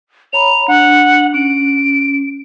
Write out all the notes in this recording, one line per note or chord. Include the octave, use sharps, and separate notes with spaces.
C#5 A#5 B5 F7
D4 F#5
C#4 D7